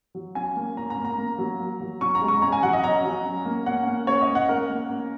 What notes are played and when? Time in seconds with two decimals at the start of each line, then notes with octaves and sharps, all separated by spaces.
0.15 F#3
0.35 C#4 G#5
0.56 A#3
0.77 C#4 A#5
0.90 A#5
0.98 A#3
1.05 A#5
1.18 A#3
1.38 F#3
1.59 A#3
1.81 F#3
2.01 C#4 C#6
2.15 A#5
2.22 G#3
2.28 C#6
2.42 C#4 A#5
2.52 G#5
2.63 F#3 F#5
2.73 D#5
2.83 C#4 A#5
3.04 F#3
3.25 C#4
3.45 A#3
3.66 C#4 F#5
3.87 A#3
4.07 C#4 C#5
4.21 D#5
4.29 A#3
4.35 F#5
4.49 C#4 A#4
4.70 A#3
4.90 C#4